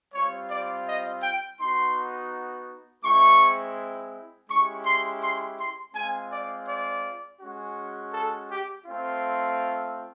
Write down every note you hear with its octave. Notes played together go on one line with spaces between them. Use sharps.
G3 C4 F4 C#5
D5
D#5
G5
B3 D#4 F#4 C6
G#3 C4 E4 C#6
G#3 C#4 E4 G4 C#6
C6
C6
C6
G#3 C4 F4 G#5
D5
D5
G#3 C#4 F#4
A4
G4
A3 C4 F4